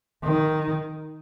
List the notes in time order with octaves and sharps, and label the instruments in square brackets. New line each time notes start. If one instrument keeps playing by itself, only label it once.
[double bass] D#3